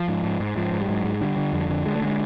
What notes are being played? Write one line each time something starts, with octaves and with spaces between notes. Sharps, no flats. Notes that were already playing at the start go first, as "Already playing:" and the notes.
Already playing: F3
G#2
G#2
G#2
G#2 F3
G#2
G3
G#2 F#3
G#2
D3 G3
D3
F2
D3
D3 G#3
A3
D3 G#3